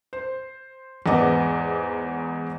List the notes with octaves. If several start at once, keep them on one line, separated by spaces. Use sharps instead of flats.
C5
E2 G#2 B3 D#5 F#5 D6